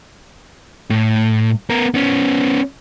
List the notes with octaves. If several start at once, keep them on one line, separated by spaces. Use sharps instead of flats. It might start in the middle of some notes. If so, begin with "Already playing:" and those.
A2
B3 A#4
B3 C#4